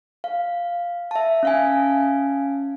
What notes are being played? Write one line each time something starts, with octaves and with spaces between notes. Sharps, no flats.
F5
E5 A5
C#4 F5 G#5